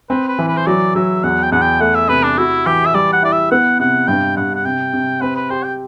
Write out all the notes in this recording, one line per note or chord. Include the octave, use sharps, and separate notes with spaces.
C4 B4
B4
E3
B4
C5
F#3 D5
F#3 E5
E2 F#5
G5
E2 F#5
G5
A3 F#5
E5
C3 B4
D4
E4 F#4
E3 G4
E5
G3 D5
F#5
E4 D5
E5
B3 F#5
C3 F#5
G2 G5
G2 F#5
F#5
C3 G5
C3
C4 B4
B4
G4 C5
G5